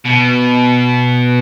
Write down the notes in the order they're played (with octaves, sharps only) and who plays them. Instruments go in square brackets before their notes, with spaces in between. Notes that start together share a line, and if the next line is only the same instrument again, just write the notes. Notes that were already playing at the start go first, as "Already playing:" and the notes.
[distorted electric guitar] B2